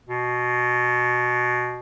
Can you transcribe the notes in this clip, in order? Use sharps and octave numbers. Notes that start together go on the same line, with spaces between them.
B2